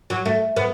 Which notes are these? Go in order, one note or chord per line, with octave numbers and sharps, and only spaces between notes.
F#3
A3
B3